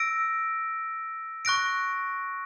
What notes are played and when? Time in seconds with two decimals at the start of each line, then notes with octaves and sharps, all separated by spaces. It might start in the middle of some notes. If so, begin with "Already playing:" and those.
Already playing: E6 A#6 D7
1.45 C#6 F#6 A#6 D7